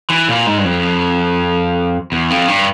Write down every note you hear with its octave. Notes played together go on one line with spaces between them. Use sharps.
E3
A#2
G#2
G2
F2
E2
F2
G2